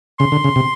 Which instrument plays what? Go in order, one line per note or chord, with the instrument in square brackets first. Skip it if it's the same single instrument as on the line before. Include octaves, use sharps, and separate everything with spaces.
[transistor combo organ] C#3 [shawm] C6
[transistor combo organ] D3
C#3
C3